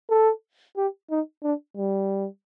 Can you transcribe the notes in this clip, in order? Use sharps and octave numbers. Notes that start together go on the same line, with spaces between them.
A4
G4
D#4
D4
G3